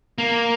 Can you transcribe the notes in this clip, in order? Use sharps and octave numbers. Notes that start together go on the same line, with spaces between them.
A#3